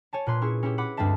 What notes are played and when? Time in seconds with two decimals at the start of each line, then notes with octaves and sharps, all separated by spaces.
0.13 C#5 G#5 A5
0.26 A#2 B4 C6
0.41 C#4 E4 G#4 G#5 C#6
0.63 C#4 E4 G4
0.78 B4 F#5 B5 D6
0.97 D2 G2 G#3 C4 E5 A5